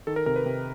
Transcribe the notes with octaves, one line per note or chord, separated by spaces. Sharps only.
D#3 A4
A#4
C3 A#4
B4
C3